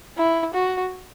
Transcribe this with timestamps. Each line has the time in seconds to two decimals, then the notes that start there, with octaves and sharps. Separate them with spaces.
0.18 E4
0.54 F#4